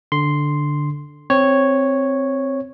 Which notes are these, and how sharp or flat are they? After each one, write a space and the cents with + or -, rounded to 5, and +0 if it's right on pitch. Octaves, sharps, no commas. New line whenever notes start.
D3 +0 C6 -5
C4 +0 C#5 -5